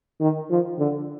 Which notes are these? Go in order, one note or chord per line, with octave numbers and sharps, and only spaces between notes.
D#3
F3
D3